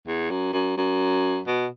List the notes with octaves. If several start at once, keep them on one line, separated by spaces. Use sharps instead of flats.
E2
F#2
F#2
F#2
B2